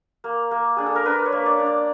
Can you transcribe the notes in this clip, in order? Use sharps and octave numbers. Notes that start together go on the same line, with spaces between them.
A#3
A#3
D4 G#4
A4
A#4
D4 B4
C#5
A#3
D5
D4
D5